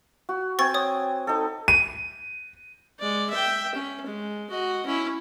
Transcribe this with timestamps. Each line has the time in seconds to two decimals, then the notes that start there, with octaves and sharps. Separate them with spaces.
0.29 F#4
0.59 C4 G#5 C#6 A6
0.74 C#5 D#6
1.27 D#4 A4
1.68 D#7
2.99 G#3 D5
3.30 E5 G5
3.75 C#4
4.06 G#3
4.50 F#4 D#5
4.86 C#4 E4